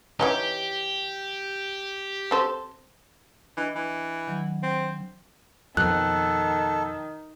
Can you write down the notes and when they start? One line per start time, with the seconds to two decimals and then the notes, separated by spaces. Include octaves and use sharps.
0.20 E3 C#4 D#4 G4
2.31 C4 A4 C5
3.57 E3 D4 D#5
3.75 E3
4.27 D#3 F#3
4.63 C4
5.77 F2 B2 D#3 A4 F#6